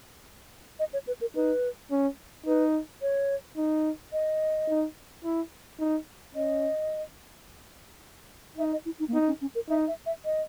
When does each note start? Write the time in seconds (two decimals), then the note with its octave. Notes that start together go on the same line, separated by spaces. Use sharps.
0.79 D#5
0.93 C#5
1.07 B4
1.21 A#4
1.35 D#4 B4
1.91 C#4
2.46 D#4 B4
3.02 C#5
3.57 D#4
4.13 D#5
4.69 D#4
5.25 E4
5.80 D#4
6.35 C#4 D#5
8.57 D#4 E5
8.72 D#5
8.85 E4
8.99 D#4
9.08 A#3
9.13 B3 D#4
9.27 C#4
9.41 C#4
9.55 A#4
9.69 D#4 E5
9.88 E5
10.06 E5
10.25 D#5